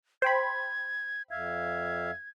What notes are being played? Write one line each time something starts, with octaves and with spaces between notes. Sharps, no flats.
C5 G5 B5 G#6
F2 E5 F5 G#6